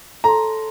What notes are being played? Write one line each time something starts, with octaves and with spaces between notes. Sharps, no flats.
A4 C#5 A5 A#5 C6